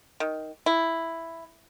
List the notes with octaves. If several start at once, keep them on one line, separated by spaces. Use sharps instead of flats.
D#3
E4